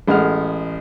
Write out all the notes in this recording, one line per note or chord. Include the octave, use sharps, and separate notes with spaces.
A1 G#3 F#5 F6